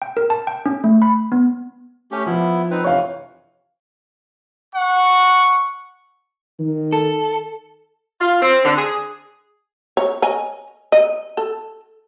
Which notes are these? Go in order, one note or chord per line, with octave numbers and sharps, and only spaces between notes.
G5
A#4
A5
G5
C#4
A3
B5
B3
A3 C#4 G4
F3 B3 E4
C4 D#4 B4
F2 C3 E3 C#5 F5
F#5 C#6
D#3
A4
F4
C4
D3
G#4
C#5
C#5 D#5 G#5
D#5
A4